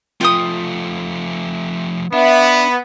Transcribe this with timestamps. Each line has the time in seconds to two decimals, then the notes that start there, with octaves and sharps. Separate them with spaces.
0.21 F3 A3 F4 G5 D#6
2.13 B3 D4 E5